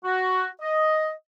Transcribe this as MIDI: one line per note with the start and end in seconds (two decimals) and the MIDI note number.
0.04 0.47 66
0.61 1.10 75